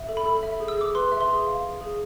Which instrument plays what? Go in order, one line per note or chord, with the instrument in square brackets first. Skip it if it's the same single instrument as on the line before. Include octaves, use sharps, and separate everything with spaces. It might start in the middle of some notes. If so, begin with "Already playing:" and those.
Already playing: [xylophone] E5
A4
B5
A4
E5
G#4
E6
G#4 D6
B4 C6
E5
C6
G#4
F5
G#4
G#4